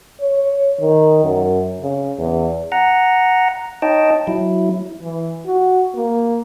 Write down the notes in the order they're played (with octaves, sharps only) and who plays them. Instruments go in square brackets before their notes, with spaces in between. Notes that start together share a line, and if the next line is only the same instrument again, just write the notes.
[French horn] C#5
D#3
F#2
C#3
E2
[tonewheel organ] F#5 A#5
D#4 C#5 D#5 G5 A5
F#3 E4
[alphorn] E3
F#4
A#3